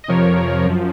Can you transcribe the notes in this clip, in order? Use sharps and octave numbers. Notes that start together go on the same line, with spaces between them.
D#5
F2 C3 F3 A#4 C#5
F#2 F3